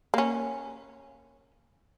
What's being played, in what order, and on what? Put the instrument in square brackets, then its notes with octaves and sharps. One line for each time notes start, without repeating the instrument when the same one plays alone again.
[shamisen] A#3 C#4